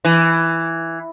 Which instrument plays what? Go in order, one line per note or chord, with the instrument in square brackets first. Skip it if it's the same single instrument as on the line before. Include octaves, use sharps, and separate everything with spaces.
[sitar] E3